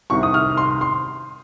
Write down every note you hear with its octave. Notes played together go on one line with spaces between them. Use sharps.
C2 C3 D#3 C#6
D#6
F6
C6
C6